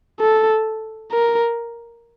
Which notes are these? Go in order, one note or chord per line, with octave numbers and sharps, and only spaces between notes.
A4
A#4